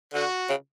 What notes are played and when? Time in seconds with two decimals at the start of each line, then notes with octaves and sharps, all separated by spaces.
0.13 D3 F#4
0.49 C#3